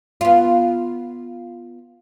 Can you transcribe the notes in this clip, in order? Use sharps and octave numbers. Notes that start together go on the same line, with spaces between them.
B3 F4